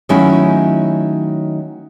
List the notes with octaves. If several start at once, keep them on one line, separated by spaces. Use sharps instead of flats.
D#3 F#3 A3 C#4 E4